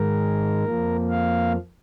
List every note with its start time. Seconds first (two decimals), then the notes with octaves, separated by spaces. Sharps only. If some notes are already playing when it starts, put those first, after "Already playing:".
Already playing: G#2 D#3 G#3 A#4
0.64 F2 F3 A#3
1.11 F5